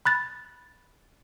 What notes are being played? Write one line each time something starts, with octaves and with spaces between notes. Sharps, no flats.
B5 F#6 A6